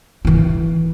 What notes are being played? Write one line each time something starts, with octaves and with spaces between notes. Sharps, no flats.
E3 E4